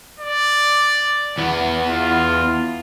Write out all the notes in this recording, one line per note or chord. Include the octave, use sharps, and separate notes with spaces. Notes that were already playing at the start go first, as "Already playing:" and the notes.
D5
E2 B3
F4